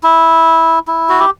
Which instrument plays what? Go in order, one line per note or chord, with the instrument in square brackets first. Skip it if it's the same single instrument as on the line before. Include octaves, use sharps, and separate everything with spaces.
[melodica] E4
E4
F#4
G4